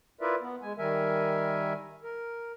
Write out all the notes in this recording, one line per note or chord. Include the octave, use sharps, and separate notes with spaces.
E4 F4 A#4 B4 D5 E5
B3
G#3 G#5
D#3 G3 A#4 E5 G#5
A#4